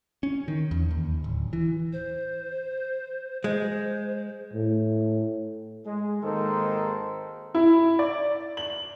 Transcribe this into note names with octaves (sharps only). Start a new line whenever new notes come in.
C#4
D#3
E2
D#2
D1
E3
C5
G#3 C5
A2
G#3
G#1 D#3 G#3 A#3 A4 C5
E4
D5
F#7